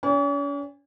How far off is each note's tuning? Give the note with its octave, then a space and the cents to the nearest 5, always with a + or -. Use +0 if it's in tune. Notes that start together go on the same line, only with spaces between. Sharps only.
C#4 +45 C5 +0 G#5 -35